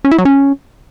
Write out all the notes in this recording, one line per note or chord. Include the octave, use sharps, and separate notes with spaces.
C#4
E4
F#3
C#4